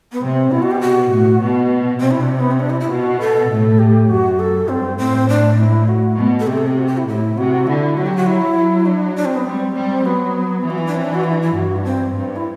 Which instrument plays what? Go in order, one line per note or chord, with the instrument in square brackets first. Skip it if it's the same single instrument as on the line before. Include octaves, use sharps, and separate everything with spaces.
[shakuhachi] B3
[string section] C3 [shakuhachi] C4
[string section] B2 [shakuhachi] E4
[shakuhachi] F#4
G4
F#4
[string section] A2
B2
[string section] C3 [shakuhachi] C4
[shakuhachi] E4
D4
C4
B3
C4
D4
E4
E4
[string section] B2 [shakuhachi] F#4
[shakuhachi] A4
[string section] A2
[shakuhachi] G4
[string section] F#2 [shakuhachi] F#4
[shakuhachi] A4
[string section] G2 [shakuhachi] C4
[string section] A2 [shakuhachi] C4
[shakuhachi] D4
E4
F#4
[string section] B2
[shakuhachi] A4
[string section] C3 [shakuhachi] G4
[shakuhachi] A4
G4
F#4
G4
E4
[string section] A2 [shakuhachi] E4
[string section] C3 [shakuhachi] F#4
[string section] D3 [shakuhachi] E4
[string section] F#3 [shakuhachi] F#4
[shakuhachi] G4
F#4
E4
[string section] F#3
[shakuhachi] D4
D4
C4
B3
[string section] G3 [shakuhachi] C4
[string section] G3
[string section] F#3 [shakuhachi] B3
[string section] E3
[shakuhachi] F#4
E4
D4
C4
D4
F#4
E4
D4
E4
[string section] G2 [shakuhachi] F#4
[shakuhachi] D4
C4
[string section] G2
[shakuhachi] E4